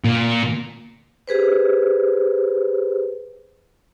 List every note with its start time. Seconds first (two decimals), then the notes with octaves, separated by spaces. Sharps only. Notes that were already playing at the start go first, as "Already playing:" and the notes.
0.04 A#2
1.28 G4 G#4 B4 C5